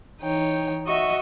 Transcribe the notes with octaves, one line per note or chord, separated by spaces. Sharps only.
E3 D#4 C#5 G5
F#4 D#5 E5 C#6